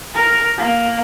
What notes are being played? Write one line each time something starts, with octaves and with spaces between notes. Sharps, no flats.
A#4
A#3